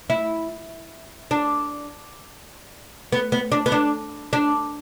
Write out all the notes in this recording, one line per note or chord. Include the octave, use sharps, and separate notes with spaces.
E4
D4
B3
B3
D4
B3
D4
D4